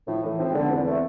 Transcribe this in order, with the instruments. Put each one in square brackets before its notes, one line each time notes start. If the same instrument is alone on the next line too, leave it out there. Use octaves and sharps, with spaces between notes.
[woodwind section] A2 [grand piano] F3
[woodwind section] A2 [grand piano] E3
[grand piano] F3 [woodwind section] C4
[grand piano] G#3
[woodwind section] D3 [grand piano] B3
[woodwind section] E2 [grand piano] C4
[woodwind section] A3